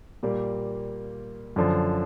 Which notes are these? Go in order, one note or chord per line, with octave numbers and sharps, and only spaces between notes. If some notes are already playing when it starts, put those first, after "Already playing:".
A#2 G3 A#3
F#2 D3 F3